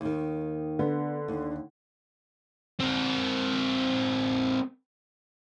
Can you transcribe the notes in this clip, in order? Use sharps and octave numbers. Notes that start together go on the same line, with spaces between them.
D#2 D#3
D3 B3
D#2
C4 A#4